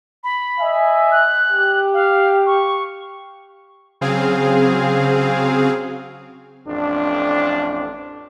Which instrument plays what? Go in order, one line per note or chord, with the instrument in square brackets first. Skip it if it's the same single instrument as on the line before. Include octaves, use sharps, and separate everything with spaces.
[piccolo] B5
[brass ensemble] D#5 E5 G#5
[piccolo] F#6
[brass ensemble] G4
[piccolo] F5
C#6
[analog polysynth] C#3 F#3 C4 G#4 F5
[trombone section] A1 F2 D4